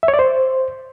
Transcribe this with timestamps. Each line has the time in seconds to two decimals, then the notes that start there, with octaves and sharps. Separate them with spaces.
0.03 E5
0.08 C#5
0.14 D5
0.19 C5